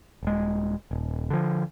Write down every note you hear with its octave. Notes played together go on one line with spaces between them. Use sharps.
D#1 G#3
D#1
D3 F3